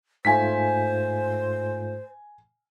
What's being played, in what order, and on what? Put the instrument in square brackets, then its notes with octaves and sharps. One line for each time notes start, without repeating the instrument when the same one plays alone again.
[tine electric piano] G#2 A3 F4 [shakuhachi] C5 [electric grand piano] G#5 B6